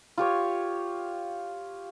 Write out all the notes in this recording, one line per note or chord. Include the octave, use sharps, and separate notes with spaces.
F4 G4 C#5